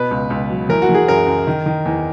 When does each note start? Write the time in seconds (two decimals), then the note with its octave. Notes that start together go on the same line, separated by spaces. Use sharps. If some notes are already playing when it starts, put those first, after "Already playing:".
Already playing: B2 B4
0.11 C#2
0.30 C#2
0.50 F#3
0.69 E3 A#4
0.82 F#4
0.89 E3
0.95 G#4
1.08 F#2 A#4
1.27 F#2
1.47 D#3
1.66 D#3
1.85 E2